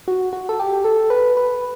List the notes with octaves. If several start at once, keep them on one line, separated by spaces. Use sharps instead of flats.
F#4
F#4
A4
G4
A4
B4
B4